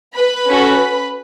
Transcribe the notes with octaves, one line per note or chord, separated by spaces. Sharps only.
B4 B5
C#4 F#4 A4